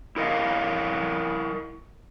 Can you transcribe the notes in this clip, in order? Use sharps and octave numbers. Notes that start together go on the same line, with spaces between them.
E4 A#4 D#5 F5